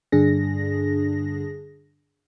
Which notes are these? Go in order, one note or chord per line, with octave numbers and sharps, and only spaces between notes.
G2 D3 D4 G#4 A#6